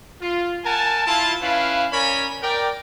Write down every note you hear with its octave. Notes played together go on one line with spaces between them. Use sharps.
F4
A#4 F#5 G#5 A5
E4 F4 A5
C#4 E4 B4 F5
C#4 A#4 C#5 D5 G#5 B5
A#4 D5 G5